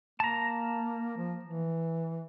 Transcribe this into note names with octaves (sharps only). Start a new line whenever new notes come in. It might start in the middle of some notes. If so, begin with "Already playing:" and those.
A#3 A5 A#5
F3
E3